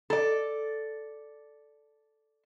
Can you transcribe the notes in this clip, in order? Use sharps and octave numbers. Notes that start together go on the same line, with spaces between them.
A4 D5